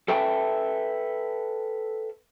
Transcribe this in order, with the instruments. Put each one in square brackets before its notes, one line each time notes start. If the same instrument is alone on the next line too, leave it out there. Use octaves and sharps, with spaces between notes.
[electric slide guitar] A4 B4 E5 G5 A5